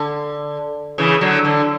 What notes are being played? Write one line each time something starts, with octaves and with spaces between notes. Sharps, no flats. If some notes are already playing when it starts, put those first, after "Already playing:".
Already playing: D3
C#3 E3
D3 F#3
D3